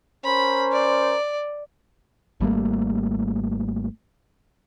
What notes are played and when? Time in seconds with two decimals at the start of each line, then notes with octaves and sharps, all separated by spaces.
0.24 C#4 A#4 C5 B5
0.72 D5
2.40 G#1 G3 A3 A#3